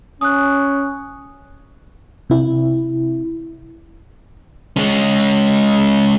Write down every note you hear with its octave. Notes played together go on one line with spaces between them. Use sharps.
C#4 D#6 F#6
C3 E4
G#3 C#4